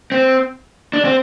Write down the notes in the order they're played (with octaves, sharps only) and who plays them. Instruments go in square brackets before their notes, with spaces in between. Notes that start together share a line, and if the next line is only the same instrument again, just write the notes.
[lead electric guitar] C4
D4
C4